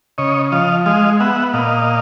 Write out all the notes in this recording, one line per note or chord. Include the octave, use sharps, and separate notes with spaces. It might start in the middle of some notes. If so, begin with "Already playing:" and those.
C#3 C#5 D#5
F3 D#5 F5
G#3 D#5 F5
B3 E5 F#5
A#2 D#5 F5